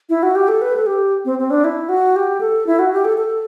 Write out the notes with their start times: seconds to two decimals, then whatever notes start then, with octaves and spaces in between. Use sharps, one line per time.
0.09 E4
0.23 F#4
0.35 G4
0.48 A4
0.62 B4
0.76 A4
0.86 G4
1.25 C4
1.39 C4
1.51 D4
1.64 E4
1.89 F#4
2.16 G4
2.41 A4
2.67 E4
2.79 F#4
2.93 G4
3.05 A4
3.18 A4